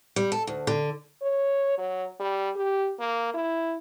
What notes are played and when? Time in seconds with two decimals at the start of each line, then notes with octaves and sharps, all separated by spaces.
0.16 G3
0.32 A4
0.47 D2
0.67 D3
1.22 C#5
1.78 F#3
2.20 G3
2.56 G4
3.00 A#3
3.34 E4